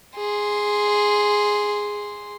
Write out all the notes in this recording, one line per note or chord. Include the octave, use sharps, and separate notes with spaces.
G#4 C6